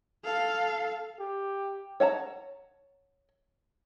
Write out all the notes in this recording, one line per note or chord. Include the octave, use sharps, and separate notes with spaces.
A4 F5
G4
C#5 F#5 A5 A#5